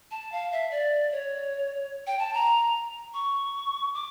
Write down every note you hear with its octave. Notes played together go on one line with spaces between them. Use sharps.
A5
F5
E5
D5
C#5
G5
A5
A#5
C#6
D6